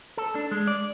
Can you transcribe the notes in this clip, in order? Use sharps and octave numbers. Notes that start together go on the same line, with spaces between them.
A4
D4
G#3
D5